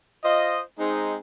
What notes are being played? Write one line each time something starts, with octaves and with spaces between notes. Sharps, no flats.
F4 C5 D#5
G#3 C4 D#4